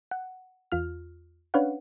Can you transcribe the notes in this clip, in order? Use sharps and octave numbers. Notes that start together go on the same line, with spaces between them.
F#5
E2 F4 F6
C#4 D4 B4 C#5 F5 F#5